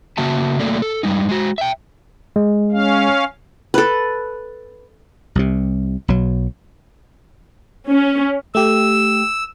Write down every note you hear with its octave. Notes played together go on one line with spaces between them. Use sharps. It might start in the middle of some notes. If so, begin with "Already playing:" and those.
C#3 A#3 F#4 E5 A5
F#3 A3 A#3 A4 D5
A4
G2 B2 G3 G#3 D#4
G#3 F#4
E5 G5
G#3
C#4 F5
A4 B4
C2 C3
B1 B2 F#3
C#4
A3 G4 E6